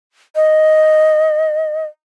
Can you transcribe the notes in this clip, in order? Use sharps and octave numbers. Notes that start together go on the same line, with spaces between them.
D#5